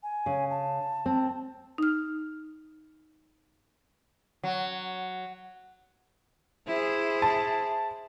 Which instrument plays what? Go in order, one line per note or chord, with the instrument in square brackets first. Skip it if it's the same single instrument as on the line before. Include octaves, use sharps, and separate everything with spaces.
[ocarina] G#5
[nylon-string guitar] C#3
[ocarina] A5
[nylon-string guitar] C4
[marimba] D#4 F6
[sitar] F#3
[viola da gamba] E4 G#4 C5
[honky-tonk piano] A5